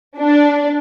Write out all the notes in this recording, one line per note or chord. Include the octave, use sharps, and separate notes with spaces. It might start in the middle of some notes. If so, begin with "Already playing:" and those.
D4